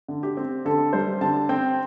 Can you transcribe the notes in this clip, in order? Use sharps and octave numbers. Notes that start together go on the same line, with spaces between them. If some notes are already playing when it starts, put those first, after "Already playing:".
D3
G4
C4
D3 A4
G3 C5
D3 A5
C4 G5